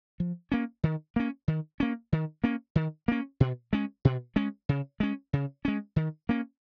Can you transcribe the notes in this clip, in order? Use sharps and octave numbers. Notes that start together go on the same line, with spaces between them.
F3
A#3 C#4
D#3
A#3 C#4
D#3
A#3 C#4
D#3
A#3 C#4
D#3
A#3 C#4
B2
G#3 C#4
B2
G#3 C#4
C#3
G#3 C#4
C#3
G#3 C#4
D#3
A#3 C#4